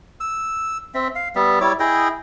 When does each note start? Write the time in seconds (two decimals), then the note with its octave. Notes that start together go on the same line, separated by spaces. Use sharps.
0.20 E6
0.94 C4 E5
1.16 F5
1.35 G3 B3 E5
1.61 G3 E4 C#5 D6
1.80 E4 G#4 D#5 G5